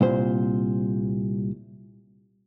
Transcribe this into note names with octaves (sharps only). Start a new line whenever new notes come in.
C2 A#2 C5